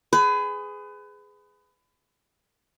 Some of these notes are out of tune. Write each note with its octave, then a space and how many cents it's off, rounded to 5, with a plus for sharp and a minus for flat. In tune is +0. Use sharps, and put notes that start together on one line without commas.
G#4 +0 B4 +30